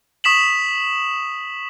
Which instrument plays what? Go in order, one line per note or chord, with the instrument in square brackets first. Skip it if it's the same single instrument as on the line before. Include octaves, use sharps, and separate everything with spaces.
[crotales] C#6 D#6 B6 E7 F#7